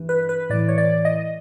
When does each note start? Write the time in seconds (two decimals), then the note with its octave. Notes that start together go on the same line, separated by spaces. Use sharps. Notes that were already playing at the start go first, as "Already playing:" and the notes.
Already playing: G2 E3
0.09 B4
0.29 B4
0.50 A2 E3 D5
0.68 C#5
0.78 D5
1.05 D#5